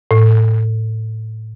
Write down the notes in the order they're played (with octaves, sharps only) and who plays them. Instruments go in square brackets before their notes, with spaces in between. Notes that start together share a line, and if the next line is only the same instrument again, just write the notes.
[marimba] A2